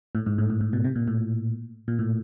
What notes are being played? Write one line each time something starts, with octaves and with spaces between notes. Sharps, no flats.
A2
G#2
A2
G#2
A2
B2
C3
A#2
A2
A#2
A2